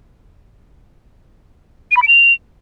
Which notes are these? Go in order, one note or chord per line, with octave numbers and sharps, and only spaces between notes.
D#7
B5
D7
F7